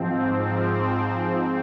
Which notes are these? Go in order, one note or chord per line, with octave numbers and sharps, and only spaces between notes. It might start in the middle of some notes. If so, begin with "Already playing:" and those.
Already playing: G#2 F3 C4
C4
G#2